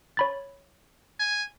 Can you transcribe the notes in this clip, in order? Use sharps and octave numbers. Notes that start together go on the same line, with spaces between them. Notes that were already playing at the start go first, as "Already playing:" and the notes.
C#5 B5 A6
G#5